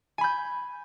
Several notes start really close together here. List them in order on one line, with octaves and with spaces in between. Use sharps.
G#5 B5 G6